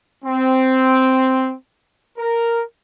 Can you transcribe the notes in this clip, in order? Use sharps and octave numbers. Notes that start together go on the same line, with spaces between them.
C4
A#4